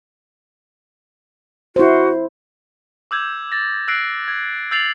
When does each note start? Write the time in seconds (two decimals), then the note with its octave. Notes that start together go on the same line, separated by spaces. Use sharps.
1.76 E4 F#4 C5
3.11 D6 E6 G6 G#6
3.52 A6 A#6
3.88 E6 F#6 A#6 C7 D7
4.28 G#6
4.71 E6 G6 A6 C7 F7 F#7